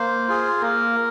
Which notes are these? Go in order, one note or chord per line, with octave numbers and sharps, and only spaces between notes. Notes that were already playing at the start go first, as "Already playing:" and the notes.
Already playing: A#3 C5
F4 G#4
A#3 A#4